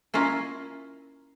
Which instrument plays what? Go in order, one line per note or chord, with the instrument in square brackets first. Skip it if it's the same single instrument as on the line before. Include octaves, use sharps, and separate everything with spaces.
[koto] A#3 C#4 E4 F4 A#4